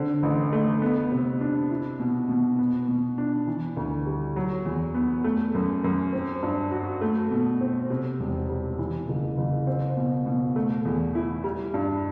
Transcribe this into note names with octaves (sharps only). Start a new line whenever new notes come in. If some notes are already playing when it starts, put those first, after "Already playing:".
Already playing: D3 C4
A1
A3
B3
C3
D4
E4
B2
B2
B3
B2
D4
E3
D2
G3
F#3
E2
B3
A3
F#2
F#2
C4
G2
F#4
A3
B2
C4
C3
E1
G3
E3
F#1
F#1
C4
B2
B2
A3
E2
E4
G3
G2